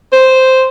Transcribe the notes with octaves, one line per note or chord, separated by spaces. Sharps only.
C5